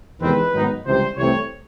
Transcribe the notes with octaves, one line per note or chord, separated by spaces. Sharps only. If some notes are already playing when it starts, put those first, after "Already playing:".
E2 C3 D#3 G#3 C4 B4
G#2 D#3 F#3 B3 D#4
C#2 C3 E3 G3 C5
C2 C3 E3 A3 C4 C#5